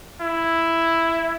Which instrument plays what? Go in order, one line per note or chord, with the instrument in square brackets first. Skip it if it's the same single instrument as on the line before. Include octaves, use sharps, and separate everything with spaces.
[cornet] E4